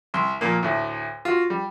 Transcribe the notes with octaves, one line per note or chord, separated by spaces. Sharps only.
C2 C6
F2 A#2 A#3
D2 A2
F4 F#4
G3